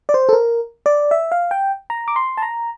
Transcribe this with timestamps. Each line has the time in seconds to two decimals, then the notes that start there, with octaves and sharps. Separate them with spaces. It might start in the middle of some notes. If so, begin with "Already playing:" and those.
0.09 D5
0.14 C5
0.29 A4
0.33 A#4
0.86 D5
1.11 E5
1.32 F5
1.51 G5
1.90 A#5
2.08 D6
2.16 C6
2.38 A5
2.42 A#5